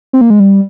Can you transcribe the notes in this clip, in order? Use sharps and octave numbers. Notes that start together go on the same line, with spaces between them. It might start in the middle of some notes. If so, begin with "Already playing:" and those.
C4
A#3
G#3
G3